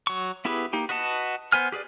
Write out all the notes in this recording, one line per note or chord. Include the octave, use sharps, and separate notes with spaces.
F#3 C#6
B3 E4 G4 G#4 B4
A#3 D#4 G4
F#4 B4 D#5 F#5 A5
B3 C5 G#5 F6
G4 G#4 B4 D5